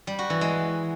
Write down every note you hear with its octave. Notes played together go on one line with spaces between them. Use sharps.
G3
F#4
E3
G#3